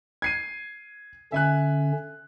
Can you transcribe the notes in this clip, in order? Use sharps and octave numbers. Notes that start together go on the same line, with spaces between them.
G#6 C7 D#7
D3 C#4 E5 G#5 F#6